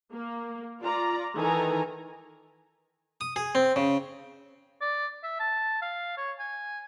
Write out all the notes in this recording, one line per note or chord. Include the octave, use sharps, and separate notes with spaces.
A#3
F4 D5 A#5
D#3 E3 A4 G#5 A#5
D#6
G#4
C4
C#3
D5
E5
A5
F5
C#5
G#5